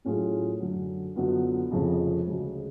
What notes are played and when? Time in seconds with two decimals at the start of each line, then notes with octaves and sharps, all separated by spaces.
0.05 A2 F#3 C#4 F4 G#4
0.60 F#2 D3 F#3
1.16 F#2 D3 F#3 B3 F4
1.71 F1 F2 C#3 F3
2.27 D2 C#3 G#3